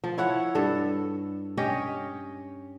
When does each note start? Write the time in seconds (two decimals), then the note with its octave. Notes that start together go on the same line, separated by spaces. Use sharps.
0.04 F3
0.18 E4 C#5 F#5
0.55 G2 A4
1.57 C#4 G4 C#5 D#5